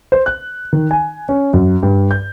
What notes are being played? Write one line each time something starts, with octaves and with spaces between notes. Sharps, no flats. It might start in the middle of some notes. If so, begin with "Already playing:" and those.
C5
F#6
D#3
G#5
C#4
F#2
G2
G6